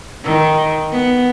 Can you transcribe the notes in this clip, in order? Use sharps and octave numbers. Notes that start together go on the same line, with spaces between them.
D#3
B3